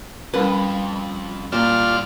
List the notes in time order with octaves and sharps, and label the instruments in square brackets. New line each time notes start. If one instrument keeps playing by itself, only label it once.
[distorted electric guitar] F2 [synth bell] G3 C#4 B5 [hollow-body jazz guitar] B4
[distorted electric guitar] C2 C5 [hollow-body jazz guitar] A#2 [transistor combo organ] F4 D5 F6